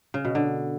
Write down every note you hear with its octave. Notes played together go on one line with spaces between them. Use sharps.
C#3
B2
D3